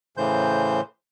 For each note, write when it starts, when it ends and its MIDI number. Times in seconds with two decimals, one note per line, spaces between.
0.17 0.81 45
0.17 0.81 49
0.17 0.81 52
0.17 0.81 72
0.17 0.81 91